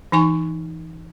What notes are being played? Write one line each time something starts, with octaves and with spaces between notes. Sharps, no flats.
E3 D#4 G#5 C#6